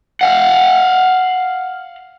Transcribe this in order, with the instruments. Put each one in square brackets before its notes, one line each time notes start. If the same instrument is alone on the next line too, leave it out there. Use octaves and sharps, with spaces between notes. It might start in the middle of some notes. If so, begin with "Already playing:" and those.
[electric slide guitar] F5 F#5